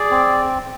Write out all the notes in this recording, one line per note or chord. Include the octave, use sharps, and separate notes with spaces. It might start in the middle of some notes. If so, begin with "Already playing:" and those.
Already playing: G#4 D5
C4